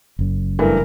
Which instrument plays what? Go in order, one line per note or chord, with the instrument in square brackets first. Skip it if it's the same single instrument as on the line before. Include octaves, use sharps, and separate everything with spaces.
[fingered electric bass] F#1 F#2
[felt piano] G2 E3 A3 [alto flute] A#4